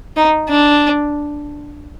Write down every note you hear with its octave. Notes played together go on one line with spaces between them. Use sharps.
D#4
D4